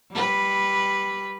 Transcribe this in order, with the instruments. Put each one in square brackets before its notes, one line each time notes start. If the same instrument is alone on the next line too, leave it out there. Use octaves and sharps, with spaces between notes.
[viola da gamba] G3 B4